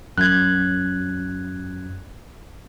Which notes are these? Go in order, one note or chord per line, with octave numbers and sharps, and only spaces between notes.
F#2 F#6 G#6